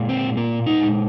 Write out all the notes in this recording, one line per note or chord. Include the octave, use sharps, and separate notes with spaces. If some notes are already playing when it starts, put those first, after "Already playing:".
Already playing: A#2 G#3
C4
A#2 A#3
D#4
G#3